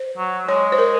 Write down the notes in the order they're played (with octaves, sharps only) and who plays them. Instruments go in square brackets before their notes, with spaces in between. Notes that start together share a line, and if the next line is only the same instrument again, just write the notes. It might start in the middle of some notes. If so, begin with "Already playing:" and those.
Already playing: [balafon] C5
[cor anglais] F#3
[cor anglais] G#3 [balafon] C#5
[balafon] C5
A#4